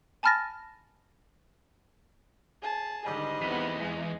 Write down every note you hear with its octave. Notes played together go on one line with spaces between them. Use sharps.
G#5 A5 B5 F6 A6 A#6
G#4 A5
G#2 D3 D#3 G3 D#5
E2 E3 B3 C4
G#3